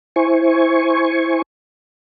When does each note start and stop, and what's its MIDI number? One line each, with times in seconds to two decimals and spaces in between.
0.16 1.42 64
0.16 1.42 72
0.16 1.42 80
0.16 1.42 85